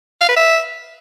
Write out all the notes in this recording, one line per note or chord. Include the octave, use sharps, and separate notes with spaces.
F5
B4
E5